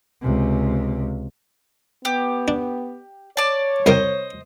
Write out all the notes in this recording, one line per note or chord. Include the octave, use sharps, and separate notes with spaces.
C#2 C3
B3 G4
D4
C#5 D5 A5
C2 A#4 C5 D#5 G5